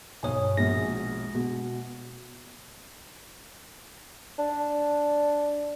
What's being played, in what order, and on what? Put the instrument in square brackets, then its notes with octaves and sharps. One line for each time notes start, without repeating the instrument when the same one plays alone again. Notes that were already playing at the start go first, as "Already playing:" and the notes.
[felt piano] B1 D#6 [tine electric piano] G2 C#5 G#5
[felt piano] A#1 B2 [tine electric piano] G#3 A#6
[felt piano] B2
[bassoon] D4